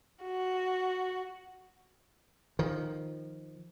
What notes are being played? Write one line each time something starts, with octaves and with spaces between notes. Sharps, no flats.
F#4
D#3 F3